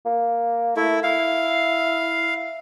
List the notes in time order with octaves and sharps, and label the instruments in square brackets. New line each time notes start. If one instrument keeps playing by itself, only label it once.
[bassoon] A#3
[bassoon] A3 [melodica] E4
[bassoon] E4 [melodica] F5